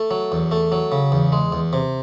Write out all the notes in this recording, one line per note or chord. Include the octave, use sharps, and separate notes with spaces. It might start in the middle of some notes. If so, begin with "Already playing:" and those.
Already playing: A3
F#3
E2
A3
F#3
C#3
E2
G#3
E2
C3